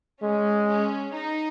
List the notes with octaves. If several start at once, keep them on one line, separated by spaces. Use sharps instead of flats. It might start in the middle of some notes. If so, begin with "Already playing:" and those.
G#3 C#4
C#4
D#4